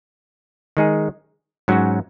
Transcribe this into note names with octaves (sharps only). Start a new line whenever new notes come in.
D#3 G#3 D#4 G#4
G#2 F#3 C#4 F#4